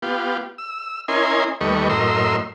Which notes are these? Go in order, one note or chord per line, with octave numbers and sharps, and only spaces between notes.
B3 F4 G4
E6
C#4 E4 A#4 D#5 G#5 C6
D#2 G3 A3 B4 D#5 C#6
F#2 A2 A#4 D#5 C6 E6